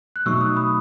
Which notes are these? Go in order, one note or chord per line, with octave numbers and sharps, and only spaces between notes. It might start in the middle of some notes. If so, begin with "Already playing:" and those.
F#6
B2 F#3 A3 D#4 C#6 E6
D#6 F#6
B5 D#6